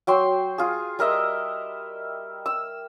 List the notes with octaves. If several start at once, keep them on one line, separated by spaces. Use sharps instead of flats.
F#3 G5 C6
F4 G#4
G3 A#4 D#5 E5
E6